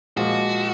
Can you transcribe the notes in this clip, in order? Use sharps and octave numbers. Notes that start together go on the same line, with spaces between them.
A#2 F3 G#3 F#4